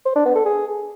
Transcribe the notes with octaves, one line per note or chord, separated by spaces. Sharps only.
C5
D4
B3
A4
G#4